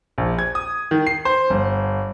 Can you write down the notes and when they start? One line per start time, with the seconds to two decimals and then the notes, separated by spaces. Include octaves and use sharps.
0.18 A#1
0.39 G#6
0.55 D#6
0.91 D#3
1.07 C7
1.25 C5
1.50 G1